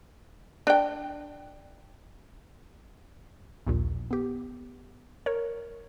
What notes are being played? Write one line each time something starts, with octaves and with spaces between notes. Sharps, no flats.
D4 G5
A#1 D#2 A#2
B3 G4
A#4 C#5